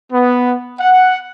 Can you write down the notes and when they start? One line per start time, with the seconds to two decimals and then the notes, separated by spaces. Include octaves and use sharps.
0.12 B3
0.79 F#5